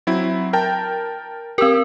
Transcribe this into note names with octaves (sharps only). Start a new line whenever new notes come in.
F#3 C4 E4
A#4 G5 A5
C4 G4 A#4 E6